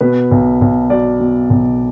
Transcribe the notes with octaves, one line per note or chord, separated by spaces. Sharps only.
B2 B4
B1
B1
F#3 D5
B2
B1